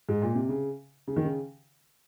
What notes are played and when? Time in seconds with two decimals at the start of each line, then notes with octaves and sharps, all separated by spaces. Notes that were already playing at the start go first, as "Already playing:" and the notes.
0.09 G#2
0.22 A#2
0.35 C3
0.49 C#3
1.08 C#3
1.16 D#3
1.25 C#3